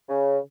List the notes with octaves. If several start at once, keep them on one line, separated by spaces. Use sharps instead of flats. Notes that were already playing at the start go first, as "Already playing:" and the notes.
C#3